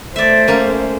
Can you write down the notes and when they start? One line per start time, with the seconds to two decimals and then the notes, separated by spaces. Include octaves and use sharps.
0.16 A3 C5 D5 E5
0.47 A#3 C#4